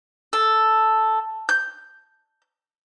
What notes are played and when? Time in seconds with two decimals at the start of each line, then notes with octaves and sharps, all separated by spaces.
0.33 A4
1.49 G6